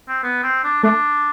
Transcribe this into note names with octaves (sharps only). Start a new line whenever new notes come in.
C4
B3
C4
D4
A3 D4